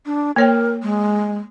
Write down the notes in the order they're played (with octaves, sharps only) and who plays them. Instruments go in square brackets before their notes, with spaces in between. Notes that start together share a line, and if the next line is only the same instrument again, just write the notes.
[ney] D4
[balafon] A#3 C#5 G5 [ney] A#4
[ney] G#3